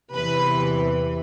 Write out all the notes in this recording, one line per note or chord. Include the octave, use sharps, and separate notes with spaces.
E2 C3 E3 B4